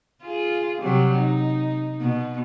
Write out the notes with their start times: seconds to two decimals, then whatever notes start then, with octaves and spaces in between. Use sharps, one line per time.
0.24 F4 G#4
0.81 C3 F#3 G3
1.19 D#4
2.01 B2